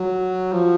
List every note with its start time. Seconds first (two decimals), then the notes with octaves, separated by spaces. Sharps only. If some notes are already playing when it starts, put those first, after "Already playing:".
Already playing: F#3
0.52 F3